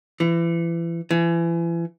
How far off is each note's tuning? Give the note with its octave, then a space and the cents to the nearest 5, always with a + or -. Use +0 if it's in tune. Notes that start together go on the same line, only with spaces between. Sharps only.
E3 +30
E3 +35